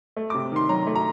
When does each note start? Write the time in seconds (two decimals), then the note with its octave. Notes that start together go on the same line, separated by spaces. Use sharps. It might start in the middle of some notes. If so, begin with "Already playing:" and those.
0.17 A3
0.30 D6
0.34 C3
0.52 D#3 C6
0.69 F#3 A#5
0.87 A3
0.96 A#5